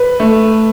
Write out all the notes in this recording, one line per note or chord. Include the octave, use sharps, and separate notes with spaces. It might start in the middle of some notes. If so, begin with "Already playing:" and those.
Already playing: B4
A3